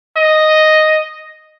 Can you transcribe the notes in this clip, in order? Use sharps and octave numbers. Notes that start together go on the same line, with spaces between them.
D#5